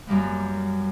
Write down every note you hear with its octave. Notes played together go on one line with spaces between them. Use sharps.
F#2 G3 A#3 B3